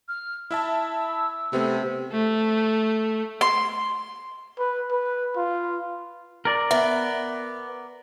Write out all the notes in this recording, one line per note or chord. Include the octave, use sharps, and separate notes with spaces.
F6
E4 E5 A5 E6
C3 A3 B3
A3
C6
B4
B4
F4
A#4 D5
B3 E5